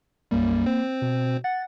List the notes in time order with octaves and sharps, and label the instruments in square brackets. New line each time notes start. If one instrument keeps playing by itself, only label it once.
[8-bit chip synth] B1 F#2 G3 [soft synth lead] A#3
[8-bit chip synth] C4 C5
[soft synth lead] B2
[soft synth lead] F#5 [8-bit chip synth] A6